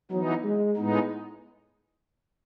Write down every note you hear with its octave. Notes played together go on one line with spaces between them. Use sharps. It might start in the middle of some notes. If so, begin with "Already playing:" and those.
E3 F#3 B3 D#4
G#3
A2 G#3 B3 D#4